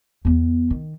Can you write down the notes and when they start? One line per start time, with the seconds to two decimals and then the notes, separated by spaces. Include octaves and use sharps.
0.25 E2 B3
0.71 D#3